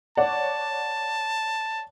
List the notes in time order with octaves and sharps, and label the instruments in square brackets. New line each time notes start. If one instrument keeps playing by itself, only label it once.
[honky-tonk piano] C#5 D5 F#5 [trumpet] A5